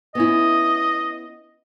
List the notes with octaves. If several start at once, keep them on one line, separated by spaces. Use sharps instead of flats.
B3 C#4 E4 D#5